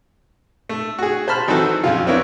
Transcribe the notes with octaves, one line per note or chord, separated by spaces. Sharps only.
A3
F#4 G#4
C5 A5 B5 F6
D#3 E3 F#3 C4 F#4 A4
F2 C#3 F4
B3 C4 D4 E4 A#4 C#5